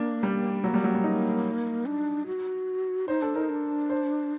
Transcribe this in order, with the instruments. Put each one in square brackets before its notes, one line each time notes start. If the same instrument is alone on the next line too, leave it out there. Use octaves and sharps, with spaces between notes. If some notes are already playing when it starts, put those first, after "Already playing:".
Already playing: [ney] A#3 [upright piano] D4
[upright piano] G3
[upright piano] F#3 [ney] A#3
[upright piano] G3
F#3
G3
D#4
[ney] D4
F#4
[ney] D#4 [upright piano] C5
[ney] D4 [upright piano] A4
[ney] D#4 [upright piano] A#4
[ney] D4
[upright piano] C5